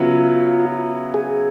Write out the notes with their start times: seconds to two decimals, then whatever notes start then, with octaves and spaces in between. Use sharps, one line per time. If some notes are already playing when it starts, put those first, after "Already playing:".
Already playing: C#3 F#3 B3 E4 F4
1.14 G#4